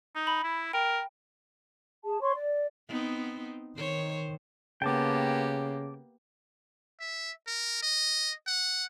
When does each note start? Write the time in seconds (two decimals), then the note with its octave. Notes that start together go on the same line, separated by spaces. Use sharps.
0.15 D#4
0.27 B5
0.44 E4
0.73 A#4 G5
2.05 G#4 A5
2.22 C#5 C6 C#6
2.35 D5
2.88 B3 C4 D#4
3.77 D#3 C5 C#5
4.82 C#3 A#3 B3 G4 G5 A5 D6
7.00 E5
7.47 A#4
7.83 D#5
8.47 F#5